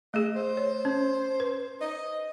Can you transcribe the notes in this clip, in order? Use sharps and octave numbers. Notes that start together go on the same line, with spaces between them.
A3 G#4 D#5
C5
C#5
C#4
B4
D#5